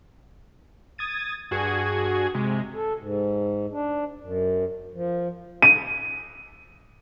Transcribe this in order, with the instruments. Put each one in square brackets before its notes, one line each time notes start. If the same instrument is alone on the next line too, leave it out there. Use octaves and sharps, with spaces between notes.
[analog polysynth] D#6 G#6 A6 D#7
G2 F#4 G#4 G#6
C3 G#3
[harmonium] A4
G#2
D4
F#2
F3
[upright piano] D#7